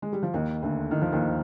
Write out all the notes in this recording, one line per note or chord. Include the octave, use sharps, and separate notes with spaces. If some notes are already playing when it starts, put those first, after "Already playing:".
G#3
G3
F3
D#2 D#3
D2 D3
D#3
F3
D#2 D#3